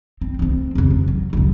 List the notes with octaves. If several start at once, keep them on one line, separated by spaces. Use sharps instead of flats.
C4
D2 C4
F2 C#3
F2
F#3
C#2 F#2